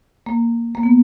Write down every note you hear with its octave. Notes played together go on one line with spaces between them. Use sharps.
A#3
A#3
B3